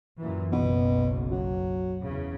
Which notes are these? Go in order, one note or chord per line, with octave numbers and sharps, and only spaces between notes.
F#2 A#2 E3
F#1 B1 B2
F#3
E2 C#3